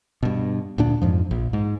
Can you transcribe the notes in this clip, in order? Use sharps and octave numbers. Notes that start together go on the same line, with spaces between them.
G2 B2
D2 A#2 D4
F2 G#2 F3
A#1
G#2